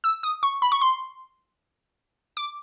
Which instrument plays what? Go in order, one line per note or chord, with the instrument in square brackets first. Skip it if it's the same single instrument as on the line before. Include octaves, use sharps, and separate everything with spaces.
[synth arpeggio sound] E6
D#6
C#6
B5
C#6
C6
D6